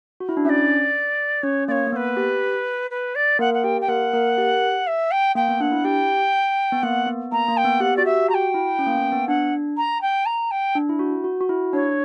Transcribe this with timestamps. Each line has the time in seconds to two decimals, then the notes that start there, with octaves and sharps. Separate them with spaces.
0.20 F#4
0.29 E4
0.37 D4
0.45 C#4 D5 E5
1.43 C#4 C#5
1.68 A#3 D5
1.71 C#5
1.87 A#3
1.92 B3 C#5
1.96 B4
2.17 G4
2.91 B4
3.15 D5
3.39 A#3 A#4 F#5
3.54 F#5
3.64 G4 G5
3.81 G5
3.88 A#3 A#4 F#5
4.13 A#3 A#4
4.30 A#4
4.38 G4
4.87 E5
5.11 G5
5.35 A#3 G5
5.48 B3
5.60 D4 F#5
5.72 E4
5.85 G4 G5
6.72 B3
6.83 A#3 F#5
7.07 B3
7.32 A#3 A#5
7.48 A#3
7.57 G5
7.65 B3
7.80 G4 F#5
7.97 F#4 D5
8.05 G4 E5
8.29 F#4 A#5
8.34 G5
8.54 E4
8.79 C#4
8.87 A#3
8.95 B3
9.12 B3
9.28 D4 F#5
9.77 A#5
10.01 G5
10.26 A#5
10.51 G5
10.75 D4
10.89 E4
10.99 F#4
11.24 F#4
11.41 F#4
11.49 E4
11.73 D4 C#5